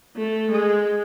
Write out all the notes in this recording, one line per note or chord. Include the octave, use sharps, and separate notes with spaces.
A3
G#3